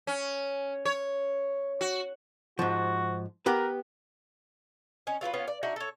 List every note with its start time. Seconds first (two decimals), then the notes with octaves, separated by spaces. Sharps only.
0.07 C#4
0.85 C#5
1.81 F#4
2.59 G#2 F3 F#4
3.46 B3 G4 A#4 B4
5.07 C#4 D#4
5.21 F#3 F4 A#4 B4
5.34 B3 C#4 F4
5.48 D5
5.63 D4 D#4 F#4 E5
5.76 A4 C#5